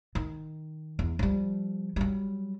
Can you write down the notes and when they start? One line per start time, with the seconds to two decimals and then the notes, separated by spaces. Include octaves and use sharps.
0.15 D#3
0.99 E2
1.19 F3 G3
1.96 F#3 G3